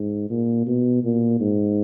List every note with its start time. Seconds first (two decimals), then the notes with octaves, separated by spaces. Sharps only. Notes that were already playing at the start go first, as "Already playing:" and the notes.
Already playing: G#2
0.30 A#2
0.67 B2
1.04 A#2
1.40 G#2